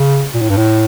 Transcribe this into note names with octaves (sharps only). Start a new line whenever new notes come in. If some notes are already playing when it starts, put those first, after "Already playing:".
Already playing: C#3
A#2
A2
G2
A2